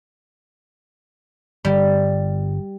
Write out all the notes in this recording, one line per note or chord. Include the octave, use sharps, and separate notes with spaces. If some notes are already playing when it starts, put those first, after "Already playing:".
G1 G3